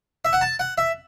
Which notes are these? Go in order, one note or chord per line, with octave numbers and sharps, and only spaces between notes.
E5
F#5
A5
F#5
E5